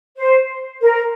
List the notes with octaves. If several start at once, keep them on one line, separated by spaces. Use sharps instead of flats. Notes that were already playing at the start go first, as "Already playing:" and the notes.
C5
A#4